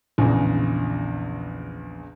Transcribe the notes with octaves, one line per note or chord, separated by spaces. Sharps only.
A#1 E2 C#3